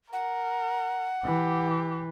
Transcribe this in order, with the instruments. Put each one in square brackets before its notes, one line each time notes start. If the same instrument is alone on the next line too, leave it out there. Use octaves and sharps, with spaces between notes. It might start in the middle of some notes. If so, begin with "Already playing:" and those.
[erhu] A#4 [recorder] F#5
[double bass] E3 [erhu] G4